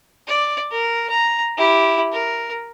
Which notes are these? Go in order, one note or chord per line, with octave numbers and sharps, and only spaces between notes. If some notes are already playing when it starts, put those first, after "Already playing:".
D5
A#4
A#5
E4 G4
A#4